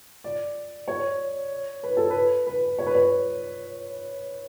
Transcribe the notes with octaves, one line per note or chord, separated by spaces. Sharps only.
D5
C#5
B4
A4
B4
B4
C#5
B4
C#5